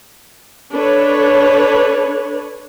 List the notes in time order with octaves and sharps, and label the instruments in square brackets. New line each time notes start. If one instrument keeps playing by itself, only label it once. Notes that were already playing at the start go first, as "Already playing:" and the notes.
[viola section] D4 A4 B4 C#5